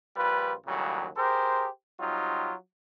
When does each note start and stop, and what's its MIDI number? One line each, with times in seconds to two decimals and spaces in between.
0.16 0.53 34
0.16 0.53 55
0.16 0.53 65
0.16 0.53 71
0.66 1.06 39
0.66 1.06 45
0.66 1.06 49
0.66 1.06 54
0.66 1.06 55
1.17 1.66 67
1.17 1.66 68
1.17 1.66 70
1.17 1.66 72
1.99 2.52 54
1.99 2.52 55
1.99 2.52 60
1.99 2.52 63
1.99 2.52 65